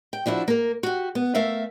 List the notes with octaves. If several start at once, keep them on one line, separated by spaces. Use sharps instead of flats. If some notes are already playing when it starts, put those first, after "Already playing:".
G5
F3 D4 E4 F#4
A#3 A#4
F#4 G4
B3
A3 A#4 E5 F5